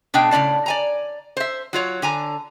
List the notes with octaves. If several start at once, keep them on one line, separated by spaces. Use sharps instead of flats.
B2 D4 G#4 G5
A2 C#3 C4 D5 A5
D5 G#5 A#5
C5 E5
F#3 F4 C#5
D3 G#5 A#5